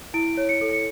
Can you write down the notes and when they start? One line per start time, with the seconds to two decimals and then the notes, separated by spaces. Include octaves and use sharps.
0.14 E4 D7
0.37 C#5
0.49 C#7
0.61 A4
0.73 C#7